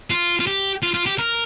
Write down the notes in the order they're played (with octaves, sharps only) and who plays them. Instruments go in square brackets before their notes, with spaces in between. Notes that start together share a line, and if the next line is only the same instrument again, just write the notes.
[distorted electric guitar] F4
F4
G4
F4
F4
G4
A#4